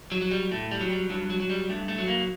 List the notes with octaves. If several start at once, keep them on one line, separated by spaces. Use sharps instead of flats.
F#3
F#3
G3
A2 A3
G3
F#3
G3
G2 F#3
F#3
F#3
G3
G2 A3
A3
F#3
A#3